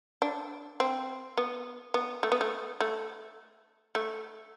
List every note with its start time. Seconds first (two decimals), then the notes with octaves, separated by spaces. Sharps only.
0.22 D4
0.80 C4
1.37 B3
1.94 B3
2.23 A3
2.32 B3
2.41 A3
2.80 A3
3.95 A3